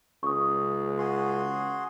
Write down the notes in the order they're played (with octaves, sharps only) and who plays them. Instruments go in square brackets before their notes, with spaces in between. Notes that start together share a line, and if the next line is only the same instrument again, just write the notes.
[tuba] C#2 [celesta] C#6 D#6
[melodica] F#4 G#4 C6